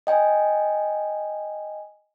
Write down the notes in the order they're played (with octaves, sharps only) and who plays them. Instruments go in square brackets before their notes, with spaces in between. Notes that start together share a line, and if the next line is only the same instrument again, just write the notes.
[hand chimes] D#5 G5 G#5